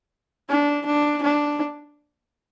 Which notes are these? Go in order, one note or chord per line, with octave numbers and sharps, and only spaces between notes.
D4
D4
D4